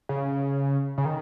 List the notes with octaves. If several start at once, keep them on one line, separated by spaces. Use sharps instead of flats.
C#3
C#3
D#3